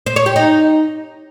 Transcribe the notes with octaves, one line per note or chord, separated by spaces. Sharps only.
C5
C#5
G4
D#4